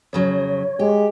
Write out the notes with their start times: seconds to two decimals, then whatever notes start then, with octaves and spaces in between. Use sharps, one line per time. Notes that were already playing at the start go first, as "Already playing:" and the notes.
0.13 F2 C#3 F#3 C#5
0.79 G#3 G4